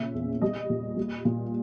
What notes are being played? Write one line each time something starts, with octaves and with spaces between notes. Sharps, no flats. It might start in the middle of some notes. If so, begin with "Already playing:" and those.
Already playing: A#2 C#3 E5
E2
G3 D#5
A#2
G3
A#2